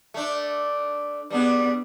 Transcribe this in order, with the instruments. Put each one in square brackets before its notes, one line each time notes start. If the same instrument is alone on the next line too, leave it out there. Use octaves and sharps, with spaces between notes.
[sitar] A3 D4
[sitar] G3 D4 G#4 [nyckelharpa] B3